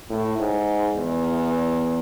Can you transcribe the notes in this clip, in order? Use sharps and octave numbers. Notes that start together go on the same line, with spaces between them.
A2
G#2
E2